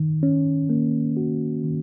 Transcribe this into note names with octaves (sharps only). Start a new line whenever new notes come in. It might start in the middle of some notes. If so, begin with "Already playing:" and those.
Already playing: D#3
C#4
A#3
F#4
D#3